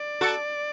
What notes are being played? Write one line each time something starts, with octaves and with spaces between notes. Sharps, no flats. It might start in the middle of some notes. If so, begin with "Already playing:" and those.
Already playing: D5
F#4 A4